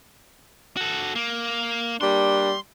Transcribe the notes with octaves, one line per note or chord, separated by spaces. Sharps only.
F#4 A4
A#3
G3 A#3 D4 C6